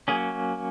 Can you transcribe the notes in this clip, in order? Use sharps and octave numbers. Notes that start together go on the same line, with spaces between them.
F#3 A#3 C#4 G#4